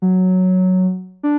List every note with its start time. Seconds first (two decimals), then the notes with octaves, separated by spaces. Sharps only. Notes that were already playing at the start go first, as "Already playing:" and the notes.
0.02 F#3
1.23 D4